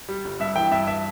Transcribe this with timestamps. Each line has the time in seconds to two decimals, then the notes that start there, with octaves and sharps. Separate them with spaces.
0.09 G3
0.24 G1
0.40 G2 E5
0.56 E3 G5
0.71 G2 E5
0.87 E5